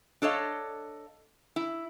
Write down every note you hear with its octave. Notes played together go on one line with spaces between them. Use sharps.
D4 A4 C#5 D#5 F5
E4